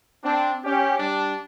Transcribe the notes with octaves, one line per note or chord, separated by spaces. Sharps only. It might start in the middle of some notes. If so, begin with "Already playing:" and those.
C4 D4
C#4 G4
G3 D4